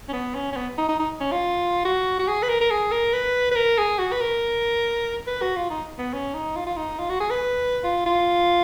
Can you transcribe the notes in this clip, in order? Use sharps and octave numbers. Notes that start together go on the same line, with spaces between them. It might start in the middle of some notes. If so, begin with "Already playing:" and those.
C#4
B3
C#4
C#4
B3
D#4
D#4
D#4
C#4
F4
F#4
F#4
G#4
B4
A#4
A#4
G#4
A#4
B4
B4
A#4
G#4
F#4
B4
A#4
B4
F#4
F4
D#4
B3
C#4
D#4
F4
F4
D#4
F4
F#4
G#4
B4
F4
F4